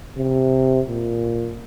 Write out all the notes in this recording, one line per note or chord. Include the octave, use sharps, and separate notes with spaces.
C3
A#2